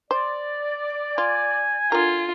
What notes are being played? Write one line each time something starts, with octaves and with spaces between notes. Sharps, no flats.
C5 D5
F4 G#5
D3 F4 A#4